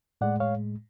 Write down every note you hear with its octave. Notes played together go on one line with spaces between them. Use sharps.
A2 G#3 D5 F#5
C#5 F5